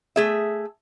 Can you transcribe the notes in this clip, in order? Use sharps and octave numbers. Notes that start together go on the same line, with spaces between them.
A3 G#4 E5